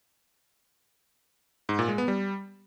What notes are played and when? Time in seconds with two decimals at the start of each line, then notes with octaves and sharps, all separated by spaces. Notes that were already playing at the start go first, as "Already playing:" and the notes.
1.69 G#2
1.79 A#2
1.88 G#3
1.98 B3
2.08 G3